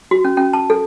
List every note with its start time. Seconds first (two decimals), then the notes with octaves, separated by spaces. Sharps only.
0.11 F#4
0.25 C#4
0.37 C#4
0.53 A5
0.70 A4